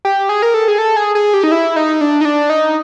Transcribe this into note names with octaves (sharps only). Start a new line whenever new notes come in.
G4
G#4
A#4
A4
G#4
A4
G#4
G#4
G4
D#4
E4
D#4
D4
D#4
D4
D#4